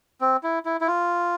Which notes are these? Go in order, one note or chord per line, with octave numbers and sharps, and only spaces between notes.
C4
E4
E4
E4
F4